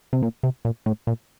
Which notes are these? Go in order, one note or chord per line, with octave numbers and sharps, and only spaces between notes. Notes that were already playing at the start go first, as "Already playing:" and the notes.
C3
A#2
C3
A#2
A2
A#2